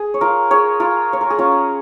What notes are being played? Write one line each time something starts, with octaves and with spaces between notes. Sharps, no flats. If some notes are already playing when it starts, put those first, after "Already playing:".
Already playing: G#4
C#5
F4 A#4
G#4 C#5
F4 A#4
C#5
A#4
G#4
C#4 F4